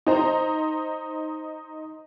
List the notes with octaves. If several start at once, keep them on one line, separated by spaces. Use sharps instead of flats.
D#4 C5 A#5